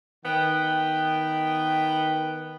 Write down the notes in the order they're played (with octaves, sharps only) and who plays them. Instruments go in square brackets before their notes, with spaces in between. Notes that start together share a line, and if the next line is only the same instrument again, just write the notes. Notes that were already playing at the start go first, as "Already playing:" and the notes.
[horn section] D#3 B3 G5